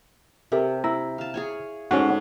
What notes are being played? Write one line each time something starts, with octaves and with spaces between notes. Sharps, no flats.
C3 G4 A#4 E5
E4 A#5
F5 A5
G#4 C#5 G#5
G#2 A3 C#4 F#4